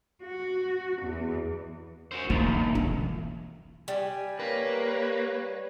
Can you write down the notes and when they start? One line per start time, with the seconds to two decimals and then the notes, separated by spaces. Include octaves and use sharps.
0.22 F#4
1.02 E2
2.11 F#4 C5
2.30 B1 E2 A#3
2.75 F4
3.88 G3 G#5
4.40 A#3 B4 C#5